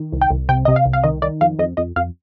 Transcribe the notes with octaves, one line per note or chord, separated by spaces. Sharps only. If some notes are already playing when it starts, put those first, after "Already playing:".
Already playing: D#3
C2
G5
C2
C3 G5
C3 D#5
F5
C2
F5
D#3 D#5
D#3 D5
F2 F5
F2 D#5
F2 D#5
F2 F5